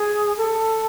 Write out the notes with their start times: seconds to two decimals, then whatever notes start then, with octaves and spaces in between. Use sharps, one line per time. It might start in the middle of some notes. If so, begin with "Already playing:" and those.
Already playing: G#4
0.37 A4